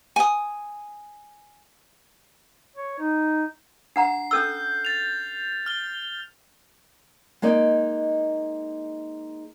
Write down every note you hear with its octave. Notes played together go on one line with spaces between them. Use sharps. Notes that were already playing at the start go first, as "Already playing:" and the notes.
G#5 D#6
C#5
D#4
D4 F#5 A#5 C7
C#4 A4 E6 F6 G6
A6 F7
F6 G7
G#3 A#3 D#4 D5 D#5